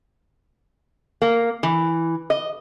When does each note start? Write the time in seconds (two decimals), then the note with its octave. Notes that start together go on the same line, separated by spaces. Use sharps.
1.22 A#3
1.63 E3
2.30 D#5